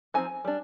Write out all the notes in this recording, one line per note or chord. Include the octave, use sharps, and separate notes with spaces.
F3 C4 D#4 G#5
G3 D4